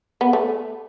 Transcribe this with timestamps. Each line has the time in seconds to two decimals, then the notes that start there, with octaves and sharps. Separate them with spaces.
0.21 B3
0.33 A3